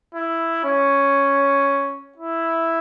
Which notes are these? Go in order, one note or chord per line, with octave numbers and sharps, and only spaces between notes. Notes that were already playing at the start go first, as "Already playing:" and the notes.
E4
C#4
E4